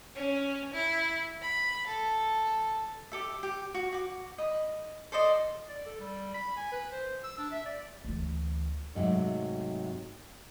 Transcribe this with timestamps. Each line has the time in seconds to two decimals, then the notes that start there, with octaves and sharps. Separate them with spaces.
0.16 C#4
0.74 E4
1.42 B5
1.87 A4
3.12 G4 A4 E5
3.43 G4
3.74 F#4
3.93 F#4 D6
4.38 D#5 B5
5.12 A4 C5 D5 D#5
5.69 D5
5.86 A4
6.00 G3
6.34 B5
6.57 G#5
6.72 B4
6.92 C5
7.24 E6
7.38 D4
7.51 E5
7.66 D5
8.05 D2 E3
8.95 G#2 C3 F3 F#3 A3